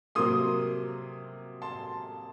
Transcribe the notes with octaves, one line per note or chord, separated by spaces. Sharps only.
C3 F#3 A#3 C6 D#6
A5 C6